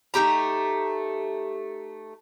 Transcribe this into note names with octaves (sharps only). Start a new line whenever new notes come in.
A3 D#4 G4 A#5